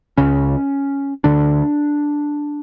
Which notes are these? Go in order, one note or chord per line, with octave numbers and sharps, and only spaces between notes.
C#2 C#3 C#4
D2 D3 D4